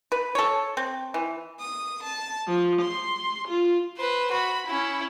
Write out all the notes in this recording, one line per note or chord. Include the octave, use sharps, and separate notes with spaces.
B4
A4 C#5
C4
E3
D#6
A5
F3
C6
F4
B4 C5
F#4 B5
C#4 E4